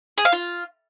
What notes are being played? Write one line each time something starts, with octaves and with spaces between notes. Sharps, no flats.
G#4
F5
F4